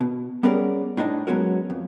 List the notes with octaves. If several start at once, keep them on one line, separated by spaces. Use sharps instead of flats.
B2
G3 B3 C#4 G#4 A#4 D5
A2 D4 D#4 F5 A5
F#3 G#3 B3 C#4 F#4 A#4
F2